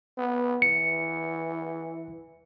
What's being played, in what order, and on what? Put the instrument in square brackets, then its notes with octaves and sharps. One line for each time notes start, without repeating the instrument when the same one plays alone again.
[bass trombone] B3
[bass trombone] E3 [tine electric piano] C#7